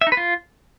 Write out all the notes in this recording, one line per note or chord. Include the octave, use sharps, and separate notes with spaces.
E5
D#4
B4
F4